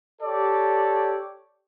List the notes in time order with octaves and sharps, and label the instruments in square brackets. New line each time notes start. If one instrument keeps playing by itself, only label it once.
[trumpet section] G4 A4 C#5 D5